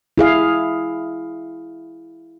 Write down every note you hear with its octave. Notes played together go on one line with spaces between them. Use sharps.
E4 G#4 F5